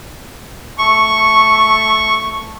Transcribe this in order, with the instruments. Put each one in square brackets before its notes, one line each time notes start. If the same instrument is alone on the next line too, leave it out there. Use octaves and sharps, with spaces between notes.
[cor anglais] A3 [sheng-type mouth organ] C#6